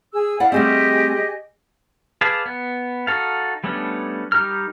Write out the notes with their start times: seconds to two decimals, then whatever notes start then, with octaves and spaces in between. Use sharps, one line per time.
0.12 G#4 E6
0.40 E4 D5 F5 F#5
0.52 G3 A3 C4 G4 G#4 D#5
2.21 G#4 B4 D5 F5 A5
2.46 B3
3.07 D#4 F#4 A4 F5
3.64 G3 A3 B3 C#4 D4
4.32 G3 D#4 G4 A#4 F6